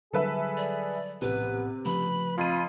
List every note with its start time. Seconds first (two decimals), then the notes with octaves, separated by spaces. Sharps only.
0.13 D3 F#3 G3 G#4 A4 B4 E5
0.57 D5
1.22 A#1 A2 C3 B3 B4
1.85 C#3 F3 A3 B4 B5
2.38 F2 F4 D#7